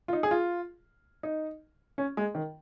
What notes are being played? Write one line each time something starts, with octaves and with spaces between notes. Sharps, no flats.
F4
D#4
G#4
F4
D#4
C#4
G#3
D#3